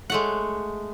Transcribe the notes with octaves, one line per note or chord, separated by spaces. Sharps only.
G#3 A3 F#5